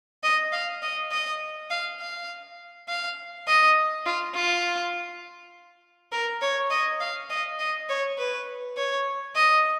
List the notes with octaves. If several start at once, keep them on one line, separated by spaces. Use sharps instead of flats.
D#5
F5
D#5
D#5
F5
F5
F5
D#5
F4
F4
A#4
C#5
D#5
F5
D#5
D#5
C#5
B4
C#5
D#5